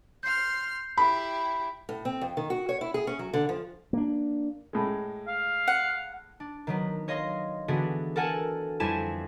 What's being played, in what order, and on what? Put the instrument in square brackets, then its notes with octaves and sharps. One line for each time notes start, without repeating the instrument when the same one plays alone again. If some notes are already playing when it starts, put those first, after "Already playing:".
[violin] C6 F6 [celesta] G6 C7
[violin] E4 G4 [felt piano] B5
[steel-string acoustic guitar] A2
C4
F2
D#3
F#4
C#5
E4
G#4
C#4
F#3
D3
F3
[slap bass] A#3 D4
[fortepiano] A2 G#3
[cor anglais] F5
[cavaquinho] F#5
[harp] D4
D#3 F#3 B3
C#5 D#5 F5 C6 A#6
D3 E3 B3 D4 F#4 G#4
A4 A#4 F#5 G#5 A5
F2 G3 E4 G#5 A5 E7